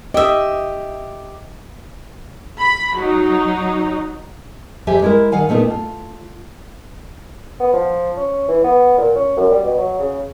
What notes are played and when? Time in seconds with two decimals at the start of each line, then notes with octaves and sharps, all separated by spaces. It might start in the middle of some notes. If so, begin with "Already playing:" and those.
0.14 G4 D#5 E5
2.59 B5
2.96 F#3 D#4
4.87 F2 G4 E5 G#5
5.02 G#3 E4 A#4
5.32 D#3 F5 F#5 G#5
5.49 A#2 A3 B3 D#4 F4
5.71 F4
7.60 B3
7.73 F3
8.17 C#4
8.48 E3
8.64 B3
8.98 A#2
9.16 C#4
9.37 F#2
9.51 G3
9.63 B2
9.78 F#3
9.99 C#3